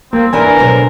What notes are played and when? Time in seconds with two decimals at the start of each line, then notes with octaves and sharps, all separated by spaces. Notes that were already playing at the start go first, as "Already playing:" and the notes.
0.13 G3 A#3 C4 E4
0.33 E2 E3 D4 A#4 B4 G#5
0.58 B2 D3 F#3 F4 C5